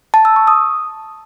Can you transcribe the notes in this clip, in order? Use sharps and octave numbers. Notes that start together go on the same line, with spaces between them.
A5
E6
C#6
D#6